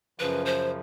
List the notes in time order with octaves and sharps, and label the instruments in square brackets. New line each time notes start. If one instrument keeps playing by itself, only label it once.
[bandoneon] F#2 C#3 F3 [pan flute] B4
[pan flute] C5